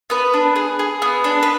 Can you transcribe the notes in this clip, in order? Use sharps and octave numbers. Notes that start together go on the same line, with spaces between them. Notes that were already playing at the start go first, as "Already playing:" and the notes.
B3 B4
D4
G#4
G#4
B3
D4
B4